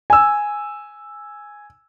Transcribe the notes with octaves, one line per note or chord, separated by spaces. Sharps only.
G#5 E6